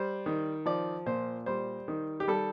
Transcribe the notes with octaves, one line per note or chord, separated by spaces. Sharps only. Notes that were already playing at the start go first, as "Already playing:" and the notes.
Already playing: G3 C5
D#3
F3 D5
A#2 C5
G3 C5
D#3
G4
G3 A4